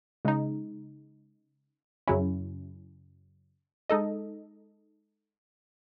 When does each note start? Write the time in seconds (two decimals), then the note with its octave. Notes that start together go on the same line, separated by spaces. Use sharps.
0.25 C#3 G#3 D#4
2.08 F#2 C#3 F#3 C#4 E4
3.90 G#3 D#4 A4 D#5